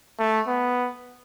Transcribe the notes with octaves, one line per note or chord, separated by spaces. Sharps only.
A3
B3